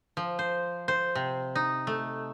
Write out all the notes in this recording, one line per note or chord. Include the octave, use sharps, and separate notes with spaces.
F3
C5
C5
C3
D#4
A3